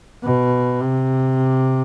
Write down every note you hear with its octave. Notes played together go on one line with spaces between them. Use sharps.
B2
C3